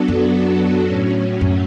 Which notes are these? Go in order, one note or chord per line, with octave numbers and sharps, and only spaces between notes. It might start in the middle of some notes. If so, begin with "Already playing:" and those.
Already playing: F#3 B3 D4 F#4 A4
F#2
A2 F#3 C#4
F#2